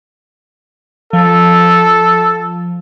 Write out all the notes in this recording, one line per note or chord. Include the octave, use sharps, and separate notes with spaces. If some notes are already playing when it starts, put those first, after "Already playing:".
F3 A4